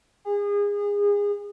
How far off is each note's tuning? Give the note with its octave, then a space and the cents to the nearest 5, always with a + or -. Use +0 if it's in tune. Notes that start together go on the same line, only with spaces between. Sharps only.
G#4 -30